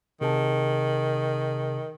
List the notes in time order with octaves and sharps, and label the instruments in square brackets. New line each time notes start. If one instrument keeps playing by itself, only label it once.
[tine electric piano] C3 G#4 A5 [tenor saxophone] D#3